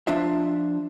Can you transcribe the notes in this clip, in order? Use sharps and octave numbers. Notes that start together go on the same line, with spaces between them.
F3 D4 F4 E5